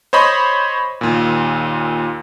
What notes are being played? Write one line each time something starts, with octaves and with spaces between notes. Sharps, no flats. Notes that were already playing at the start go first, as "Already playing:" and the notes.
C5 C#5 D#5 B5
D#2 A#2